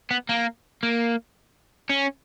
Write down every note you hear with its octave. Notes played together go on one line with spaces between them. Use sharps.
B3
A#3
A#3
C#4